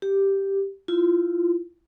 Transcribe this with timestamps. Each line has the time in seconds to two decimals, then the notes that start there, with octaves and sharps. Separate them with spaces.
0.02 G4
0.88 E4 F4